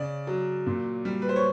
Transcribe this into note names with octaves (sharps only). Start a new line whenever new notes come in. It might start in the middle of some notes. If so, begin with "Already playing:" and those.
Already playing: C#3 D5
F#3
A#2
G3
B4
C5
C#5